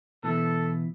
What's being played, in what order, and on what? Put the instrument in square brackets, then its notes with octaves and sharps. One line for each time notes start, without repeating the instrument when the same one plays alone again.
[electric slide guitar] B2 E3 [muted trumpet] A4